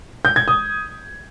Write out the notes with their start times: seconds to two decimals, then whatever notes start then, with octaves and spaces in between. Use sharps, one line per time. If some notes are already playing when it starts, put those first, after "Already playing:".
0.25 G6
0.36 G#6
0.48 D#6